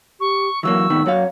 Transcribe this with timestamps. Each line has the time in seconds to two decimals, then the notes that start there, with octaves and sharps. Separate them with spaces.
0.20 G4 C#6
0.63 E3 F#3 A#3 C#6 E6
0.90 A2 D#3 B3
1.06 F#2 F#4 C#5 F5